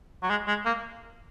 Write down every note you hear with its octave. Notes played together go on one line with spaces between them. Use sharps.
F#3
G#3
G#3
A#3